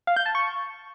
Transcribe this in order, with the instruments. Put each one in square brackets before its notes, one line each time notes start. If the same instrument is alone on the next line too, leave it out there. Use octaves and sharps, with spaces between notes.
[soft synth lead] F5
G6
A5
C#6